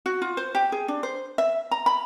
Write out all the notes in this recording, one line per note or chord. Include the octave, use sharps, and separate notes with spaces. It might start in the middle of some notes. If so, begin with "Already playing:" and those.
F#4
F4
C5
G4
G#4
D4
C5
E5
A#5
B5